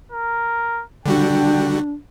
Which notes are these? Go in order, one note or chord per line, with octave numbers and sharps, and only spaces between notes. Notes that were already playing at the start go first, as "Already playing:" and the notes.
A#4
D3 G3 D4 F#4 G5